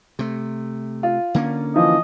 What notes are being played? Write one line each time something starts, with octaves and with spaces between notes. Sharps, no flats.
C3 A3
F4
D3 A#3 C#4
E3 F3 D#5